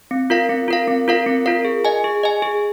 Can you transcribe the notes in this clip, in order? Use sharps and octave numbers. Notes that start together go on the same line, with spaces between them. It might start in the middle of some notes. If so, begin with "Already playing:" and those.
C4
F4 A#4 F5
C4
F4 A#4 F5
C4
F4 A#4 F5
C4
F4 A#4 F5
G#4
D#5 G#5
G#4
D#5 G#5
G#4